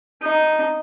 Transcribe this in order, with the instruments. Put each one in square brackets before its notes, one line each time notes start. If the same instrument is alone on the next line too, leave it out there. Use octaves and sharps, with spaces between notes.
[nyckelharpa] D#4